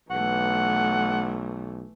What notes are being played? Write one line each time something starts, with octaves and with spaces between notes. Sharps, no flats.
B1 E3 A3 F#5